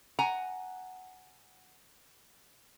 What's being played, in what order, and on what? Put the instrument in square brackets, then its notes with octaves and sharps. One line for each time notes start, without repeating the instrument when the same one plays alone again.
[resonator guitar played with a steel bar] F#5 G#5 A#5